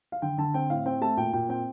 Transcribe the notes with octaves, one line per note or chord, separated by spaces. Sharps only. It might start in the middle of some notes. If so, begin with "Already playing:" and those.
F5
D3 G5
D3 A5
C4 G5
A2 F5
C4 G5
A3 A5
A#2 G5
A#2 G5
C4 G5